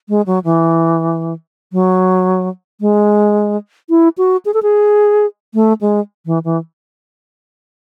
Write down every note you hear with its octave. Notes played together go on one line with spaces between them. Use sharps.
G#3
F#3
E3
F#3
G#3
E4
F#4
G#4
A4
G#4
A3
G#3
E3
E3